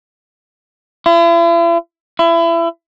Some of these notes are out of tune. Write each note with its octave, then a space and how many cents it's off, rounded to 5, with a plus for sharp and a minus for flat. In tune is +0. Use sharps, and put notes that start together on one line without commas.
E4 +45
E4 +30